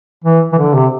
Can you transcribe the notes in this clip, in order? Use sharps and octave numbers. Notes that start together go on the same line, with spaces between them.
E3
E3
D3
C3